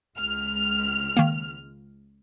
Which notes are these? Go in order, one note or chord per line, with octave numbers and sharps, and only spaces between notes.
C#2 F6
D#3 A#3